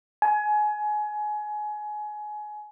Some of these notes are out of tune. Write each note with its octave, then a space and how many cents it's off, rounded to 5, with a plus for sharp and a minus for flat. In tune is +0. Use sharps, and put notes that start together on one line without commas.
G#5 +25